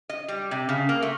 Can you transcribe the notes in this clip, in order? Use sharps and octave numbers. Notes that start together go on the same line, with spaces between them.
D#5
G3
C3
C#3
A#3
A3